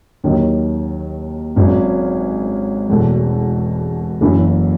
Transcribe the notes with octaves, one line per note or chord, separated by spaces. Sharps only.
D#2 D#3 F#3
G#1 G#2 F#3 C#4
E1 E2 B2 A3
F#1 F#2 E3